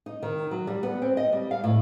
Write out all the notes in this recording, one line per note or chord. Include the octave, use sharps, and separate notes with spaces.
D#4
D#3
F#3
G3
B3
C4
D#5
G3
F5
A2